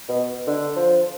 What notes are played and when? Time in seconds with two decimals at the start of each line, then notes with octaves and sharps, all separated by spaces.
0.09 B2
0.47 D3
0.76 F3